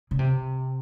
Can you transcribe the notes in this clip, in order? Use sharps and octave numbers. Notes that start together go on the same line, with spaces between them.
C#3
C3